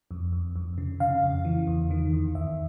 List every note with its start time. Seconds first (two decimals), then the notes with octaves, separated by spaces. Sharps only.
0.11 F2
0.32 F2
0.56 F2
0.78 C#3
1.00 C#3 F5
1.23 F2
1.45 E3
1.67 E2
1.91 D#3
2.13 E2
2.35 E2 E5